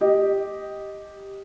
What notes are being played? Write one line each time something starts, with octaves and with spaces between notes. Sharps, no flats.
G4 D#5